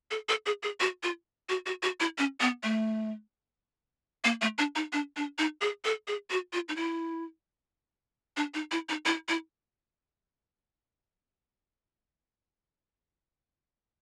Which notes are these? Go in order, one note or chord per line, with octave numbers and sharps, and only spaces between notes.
A4
A4
G#4
G#4
F#4
F4
F#4
F#4
F#4
E4
C#4
B3
A3
A#3
A3
D4
D#4
D4
D4
D#4
G#4
A4
G#4
F#4
F4
D#4
E4
D4
D#4
E4
D#4
E4
E4